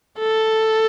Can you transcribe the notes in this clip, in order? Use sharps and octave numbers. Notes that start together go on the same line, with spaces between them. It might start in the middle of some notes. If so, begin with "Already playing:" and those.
A4